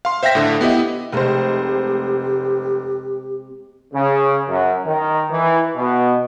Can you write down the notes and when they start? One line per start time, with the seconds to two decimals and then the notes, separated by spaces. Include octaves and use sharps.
0.05 F5 C6
0.23 C5 E5 F5 G5 A#6 B6
0.35 A2 D3
0.61 B3 E4 G4 D#5 E5
1.12 F1 C3 G#3 A3 G4 C5
3.93 C#3
4.48 F#2
4.85 D#3
5.29 E3
5.75 B2